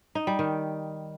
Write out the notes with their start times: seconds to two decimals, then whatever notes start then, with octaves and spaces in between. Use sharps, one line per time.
0.15 D#4
0.27 G3
0.39 D#3